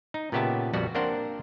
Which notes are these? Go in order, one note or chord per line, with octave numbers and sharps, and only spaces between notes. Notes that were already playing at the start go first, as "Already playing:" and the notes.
D#4
A#2 C#3 B3 G4 E5 A5
A#1 F2 G3 B3 F#4 F#5
A#3 C4 D4 A#4 C5 F#5